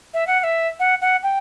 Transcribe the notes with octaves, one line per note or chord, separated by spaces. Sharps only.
E5
F#5
F#5
E5
F#5
F#5
G5